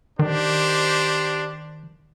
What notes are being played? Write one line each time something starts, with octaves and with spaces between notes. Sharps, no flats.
D#3 D4 G4 C5